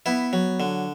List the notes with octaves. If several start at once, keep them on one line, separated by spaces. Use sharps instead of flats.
B3 E4
F#3
D3